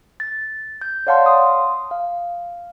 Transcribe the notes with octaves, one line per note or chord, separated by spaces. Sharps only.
A6
G6
C#5 D5 F5 F#5 A5 C6
C6 D#6
F5